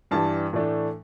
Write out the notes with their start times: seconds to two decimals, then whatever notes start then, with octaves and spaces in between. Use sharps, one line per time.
0.11 G2 E3 G3 A5
0.53 A2 E3 A3 D4